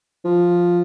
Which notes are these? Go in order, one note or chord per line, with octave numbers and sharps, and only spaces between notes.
F3